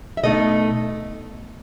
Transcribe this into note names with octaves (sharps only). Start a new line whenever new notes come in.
E5
B2 A3 D#4 D#5